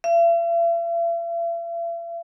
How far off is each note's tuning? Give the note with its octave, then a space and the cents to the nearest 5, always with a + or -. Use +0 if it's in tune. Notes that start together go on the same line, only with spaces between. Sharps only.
E5 +45